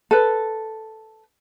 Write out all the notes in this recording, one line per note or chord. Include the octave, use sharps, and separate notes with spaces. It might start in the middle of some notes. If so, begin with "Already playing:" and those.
A4 B4